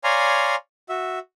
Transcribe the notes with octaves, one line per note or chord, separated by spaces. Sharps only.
C#5 D5 F5 G#5 A#5 C6
F#4 E5